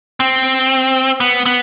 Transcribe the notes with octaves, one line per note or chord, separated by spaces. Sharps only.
C4
B3
B3